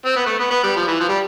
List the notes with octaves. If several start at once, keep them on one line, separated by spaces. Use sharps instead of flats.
C4
B3
A3
B3
B3
G3
F3
E3
F3
G3